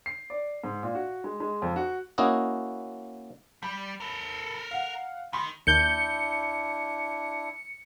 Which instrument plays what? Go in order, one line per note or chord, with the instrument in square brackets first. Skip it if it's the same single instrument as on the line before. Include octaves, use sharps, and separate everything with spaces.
[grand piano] C7
D5
G#2
A#2
F#4
G#3
G#3
F2
F#4
[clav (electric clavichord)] A#3 C#4 E4 F#4 D#5
[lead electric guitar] G3 [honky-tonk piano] B5
[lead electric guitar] A4 A#4
[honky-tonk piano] F5 F#5
[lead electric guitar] D#3 [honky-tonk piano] B5 C6
[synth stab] D#2 G6 [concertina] D4 E4 [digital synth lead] C#7